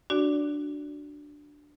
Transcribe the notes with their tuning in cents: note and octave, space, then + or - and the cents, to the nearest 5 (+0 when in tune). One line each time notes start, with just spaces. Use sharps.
D4 +0 F#4 +0 D5 -20